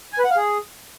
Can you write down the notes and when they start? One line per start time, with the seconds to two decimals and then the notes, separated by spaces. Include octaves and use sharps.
0.13 G#5
0.19 B4
0.25 F#5
0.31 F5
0.37 G#4